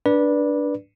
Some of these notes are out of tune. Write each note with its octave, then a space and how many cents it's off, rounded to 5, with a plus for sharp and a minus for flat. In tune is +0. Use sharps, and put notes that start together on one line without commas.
D4 -5 B4 -20 D5 +0